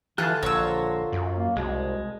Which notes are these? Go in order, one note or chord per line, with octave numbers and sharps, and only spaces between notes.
D3 E3 F4 G4 G#4 A5 F#6
A#1 F4 C#5 A#5 E6
F#2
A#3
C2 B2 G#3